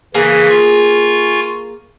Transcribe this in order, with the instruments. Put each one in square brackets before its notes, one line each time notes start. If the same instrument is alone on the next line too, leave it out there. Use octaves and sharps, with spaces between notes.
[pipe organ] C#3 E3 [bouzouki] A#3 G#4
[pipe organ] F4 G#5 C#6